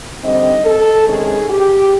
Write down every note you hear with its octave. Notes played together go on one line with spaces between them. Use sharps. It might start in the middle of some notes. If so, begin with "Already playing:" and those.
D3 G3 C4 D#4 D#5
A4
C3 D#3 G#3 C#4 G#4
G4